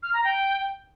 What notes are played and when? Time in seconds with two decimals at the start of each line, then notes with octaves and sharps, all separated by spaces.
0.03 F6
0.13 A#5
0.24 G5